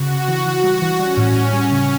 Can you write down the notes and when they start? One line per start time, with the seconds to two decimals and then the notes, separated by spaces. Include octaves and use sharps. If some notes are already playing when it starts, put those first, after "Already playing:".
Already playing: C#3 F#4
0.10 C#3
0.28 E3
0.46 E3
0.64 G3
0.82 E3
1.00 G3 C#4
1.17 A2
1.35 A2
1.53 G3
1.71 C#3